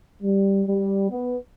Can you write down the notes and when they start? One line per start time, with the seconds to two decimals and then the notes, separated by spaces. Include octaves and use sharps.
0.23 G3
0.67 G3
1.11 B3